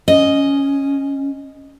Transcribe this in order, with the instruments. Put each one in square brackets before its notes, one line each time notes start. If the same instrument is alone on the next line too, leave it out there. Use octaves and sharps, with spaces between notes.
[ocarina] C#4 [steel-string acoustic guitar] D#5